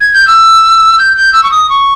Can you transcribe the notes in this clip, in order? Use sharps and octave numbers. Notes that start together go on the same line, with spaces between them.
G#6
G6
E6
G6
G6
E6
C#6
D#6
C#6